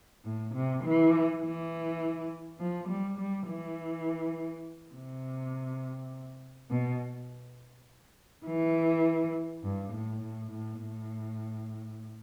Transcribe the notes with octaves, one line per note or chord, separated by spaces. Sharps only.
A2
C3
E3
E3
F3
G3
G3
E3
C3
B2
E3
G2
A2
A2
A2
A2